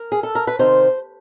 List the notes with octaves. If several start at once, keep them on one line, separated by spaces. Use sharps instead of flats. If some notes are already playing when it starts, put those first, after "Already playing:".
Already playing: A#4
G#4
A4
A#4
B4
C3 D#3 C5